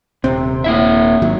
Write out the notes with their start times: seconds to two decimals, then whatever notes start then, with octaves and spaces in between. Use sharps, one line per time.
0.24 D#1 C3 C4
0.64 A#3 E4 E5
1.22 G#1 D#3 F#3